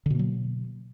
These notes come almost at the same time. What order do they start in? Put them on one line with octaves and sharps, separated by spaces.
D3 B2 A#3 F#3